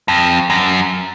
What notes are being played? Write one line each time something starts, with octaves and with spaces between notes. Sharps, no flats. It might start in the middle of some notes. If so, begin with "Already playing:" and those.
F2
F#2